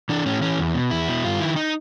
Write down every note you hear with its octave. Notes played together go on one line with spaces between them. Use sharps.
E3 D4
A2 C#4
E3 C#4
E2
B2
E2 E4
B2
G2 F4
D#3 E4
D#4